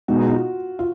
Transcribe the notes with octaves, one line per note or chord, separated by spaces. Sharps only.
B2 G#3 B3 D#4 F#4
F4
F4